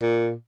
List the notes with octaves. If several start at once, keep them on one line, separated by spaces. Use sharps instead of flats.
A#2